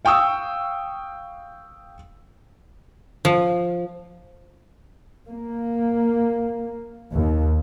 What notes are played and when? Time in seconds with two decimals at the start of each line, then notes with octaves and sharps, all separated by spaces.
0.05 F5 G5 C#6 D#6 E6
3.25 F3
5.28 A#3
7.11 D#2